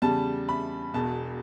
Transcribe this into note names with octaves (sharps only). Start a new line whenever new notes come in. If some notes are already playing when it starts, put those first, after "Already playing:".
E2 C#3 G3 A5
B5
E1 E2 B2 A5